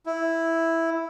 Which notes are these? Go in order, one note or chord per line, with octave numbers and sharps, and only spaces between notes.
E4